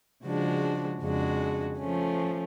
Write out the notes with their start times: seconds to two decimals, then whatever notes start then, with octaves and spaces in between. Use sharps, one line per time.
0.25 C#3 F3 G#3 D4 F#4
1.02 F2 C#3 G#3 D4 F#4
1.78 F3 A3 C#4